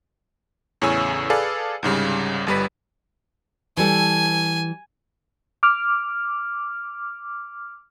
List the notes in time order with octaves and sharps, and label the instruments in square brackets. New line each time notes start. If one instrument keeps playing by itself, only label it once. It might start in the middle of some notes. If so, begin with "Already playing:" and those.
[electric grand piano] E2 A2 C#3 C#5 G#5 E6
G#4 A4 B4 D5 F5
C2 G#2 C#3 G3
G1 G3 B4 B6
[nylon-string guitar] E3 G3 A4 [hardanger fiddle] G#5
[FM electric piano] D6 F6